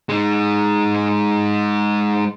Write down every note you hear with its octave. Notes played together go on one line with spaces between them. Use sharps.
G#3 D#4